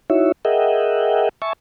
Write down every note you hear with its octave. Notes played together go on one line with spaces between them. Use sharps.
D#4 E4 F#4 C#5 E5
G#4 A#4 D#5 E5 F#5 G5
E5 G#5 A5 C#6